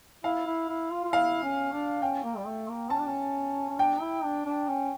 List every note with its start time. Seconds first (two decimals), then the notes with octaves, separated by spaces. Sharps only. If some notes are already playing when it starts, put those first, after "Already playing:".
0.24 E4 F5
0.46 E4
0.69 E4
0.91 F4
1.04 F4
1.13 E4 F5
1.43 C#4
1.73 D4
2.02 C#4 G5
2.24 A#3
2.37 G3
2.46 A3
2.69 A#3
2.90 C#4 A5
2.99 D4
3.07 C#4
3.69 C#4
3.79 D4 G5
4.01 E4
4.24 D4
4.46 D4
4.68 C#4